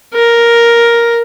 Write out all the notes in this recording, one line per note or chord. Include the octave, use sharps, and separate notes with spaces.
A#4